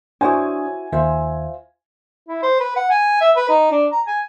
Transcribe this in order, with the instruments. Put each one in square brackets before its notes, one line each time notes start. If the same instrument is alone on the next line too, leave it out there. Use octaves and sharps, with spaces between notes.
[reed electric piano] D4 C#5 D#6 [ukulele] E4 F#4 C5 [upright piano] G#5
[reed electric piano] D#2 [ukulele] F4 C5 E5
[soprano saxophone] E4
C5
B4
F#5
G#5
E5
B4
D#4
D4
A#5
G#5